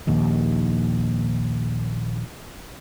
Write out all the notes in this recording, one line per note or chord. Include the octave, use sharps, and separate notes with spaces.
A#1 D#2 D#3